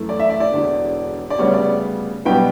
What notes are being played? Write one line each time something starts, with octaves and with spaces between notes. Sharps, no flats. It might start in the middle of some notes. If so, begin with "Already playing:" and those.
Already playing: F#2 E3 A3
D5
E5
D5
D5
E1 E2 D3
D5
D2 C#3 G3 B3 C#5
D5
B1 B2 G3 B3 G5